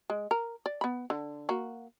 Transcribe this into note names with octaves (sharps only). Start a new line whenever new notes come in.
G#3
A#4
D5
B3 B5
D3
A#3 F#4